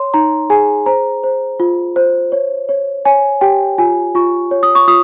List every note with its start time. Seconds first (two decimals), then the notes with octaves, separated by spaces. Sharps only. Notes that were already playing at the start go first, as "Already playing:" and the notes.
Already playing: C#5 C6
0.14 D#4 A#5
0.50 G#4 G#5
0.86 C5 A#5
1.24 C5
1.60 F4
1.96 C5
2.32 C#5
2.69 C#5
3.05 C#5 G#5
3.41 G4 G5
3.78 F4 G#5
4.15 F4 C#6
4.51 C#5
4.63 D#6
4.75 C#6
4.88 F4 D#6